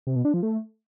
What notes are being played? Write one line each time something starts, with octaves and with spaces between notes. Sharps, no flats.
C3
B2
D4
F3
A3